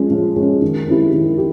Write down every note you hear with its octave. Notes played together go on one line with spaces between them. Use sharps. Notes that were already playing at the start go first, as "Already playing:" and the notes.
Already playing: F3 G#3 C#4
F3
G#3 C#4
D#3
G#3 C4 E4 G4
D#3
G4